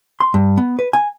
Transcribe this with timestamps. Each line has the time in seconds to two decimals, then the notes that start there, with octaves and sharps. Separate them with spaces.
0.20 C6
0.34 G2
0.58 B3
0.79 B4
0.93 G#5